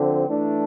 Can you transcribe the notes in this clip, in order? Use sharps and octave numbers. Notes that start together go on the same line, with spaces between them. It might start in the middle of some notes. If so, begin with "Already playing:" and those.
Already playing: D3 F3 C4
E3 A3 D4